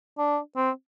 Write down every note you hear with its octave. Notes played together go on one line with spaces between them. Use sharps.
D4
C4